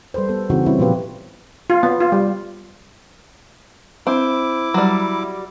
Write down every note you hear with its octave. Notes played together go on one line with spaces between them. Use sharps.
G3 A4 B4 C5
B3 A4
C#3 E3 C4 D#4 F#4
G3 C4 C#4 E4
A#2 F3 B3 F4 G4 B4
F4
B3
F4
G3
C4 E4 D6
F#3 G3